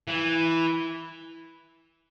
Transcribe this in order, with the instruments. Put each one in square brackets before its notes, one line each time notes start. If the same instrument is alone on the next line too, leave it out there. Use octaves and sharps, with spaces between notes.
[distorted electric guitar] E3